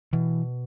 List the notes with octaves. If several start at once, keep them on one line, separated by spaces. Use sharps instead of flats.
B2 E3